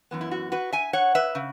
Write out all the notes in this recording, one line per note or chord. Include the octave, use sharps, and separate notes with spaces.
F#2 E3 B3
E4
F#4
F#4 B4
E5 G#5
C#5 F#5
B4 E5
C#3